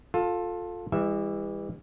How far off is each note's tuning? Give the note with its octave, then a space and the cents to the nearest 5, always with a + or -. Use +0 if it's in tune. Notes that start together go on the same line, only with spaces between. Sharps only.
F4 +20 A4 +0
E3 +0 G3 +45 E5 +0